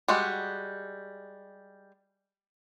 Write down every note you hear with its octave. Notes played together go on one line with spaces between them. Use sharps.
G3 G#3 F#4